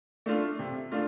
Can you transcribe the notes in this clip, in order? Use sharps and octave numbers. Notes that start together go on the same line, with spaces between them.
A3 D4 F4
C3
A3 D4 F4